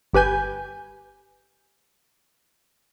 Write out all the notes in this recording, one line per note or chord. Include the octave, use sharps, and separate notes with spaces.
G1 G4 B4 G#5 G6